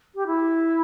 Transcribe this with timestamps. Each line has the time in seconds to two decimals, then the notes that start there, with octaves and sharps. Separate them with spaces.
0.15 G4
0.26 E4